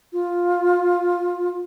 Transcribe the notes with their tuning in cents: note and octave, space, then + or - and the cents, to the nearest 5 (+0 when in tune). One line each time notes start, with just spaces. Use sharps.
F4 +10